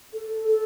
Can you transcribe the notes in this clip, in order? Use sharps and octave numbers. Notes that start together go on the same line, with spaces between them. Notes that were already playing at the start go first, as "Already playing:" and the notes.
A4
A4